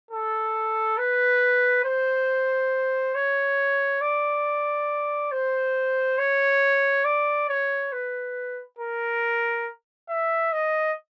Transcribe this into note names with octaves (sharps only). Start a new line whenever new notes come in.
A4
B4
C5
C#5
D5
C5
C#5
D5
C#5
B4
A#4
E5
D#5